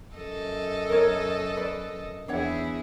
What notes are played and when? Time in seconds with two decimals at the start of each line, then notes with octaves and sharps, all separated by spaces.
0.15 F#2 A4 D#5
0.90 A#4 C#5
1.57 B4 D5
2.28 E2 D4 E4 G#4 C#5 F#5